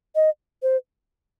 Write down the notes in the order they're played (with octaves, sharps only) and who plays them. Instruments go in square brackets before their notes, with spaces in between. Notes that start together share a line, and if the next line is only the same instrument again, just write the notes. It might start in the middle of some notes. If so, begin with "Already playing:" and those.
[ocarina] D#5
C5